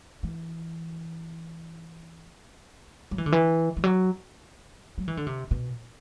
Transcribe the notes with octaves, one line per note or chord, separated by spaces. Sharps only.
E3
F#3
E3
D3
E3
E3
F#3
F#3
E3
D3
C3
B2